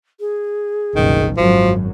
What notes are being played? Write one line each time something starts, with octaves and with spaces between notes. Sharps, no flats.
G#4
F#1 C2 B2 D#3
G#1 F#2 F3 F#3 F#4